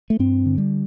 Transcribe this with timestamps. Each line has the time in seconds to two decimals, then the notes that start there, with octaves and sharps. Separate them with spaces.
0.10 A3
0.19 G2 C4
0.46 D3
0.58 G3